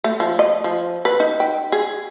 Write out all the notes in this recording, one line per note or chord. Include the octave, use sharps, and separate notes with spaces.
A3
F3
D#5
F3
B4
D#4
G5
G#4